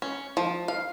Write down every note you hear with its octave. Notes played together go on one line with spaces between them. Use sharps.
C#4
F3
F5